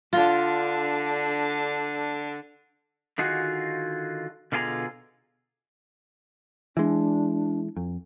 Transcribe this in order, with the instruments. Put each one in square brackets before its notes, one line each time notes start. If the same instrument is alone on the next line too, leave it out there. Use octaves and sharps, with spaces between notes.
[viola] D3 D4 [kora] F4
[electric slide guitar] D3 D#3 D#4 F4 F#4 G#4
B2 D3 F4 G#4 G#5 A#5
[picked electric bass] E3 G#3 [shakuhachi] D4
[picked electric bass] F2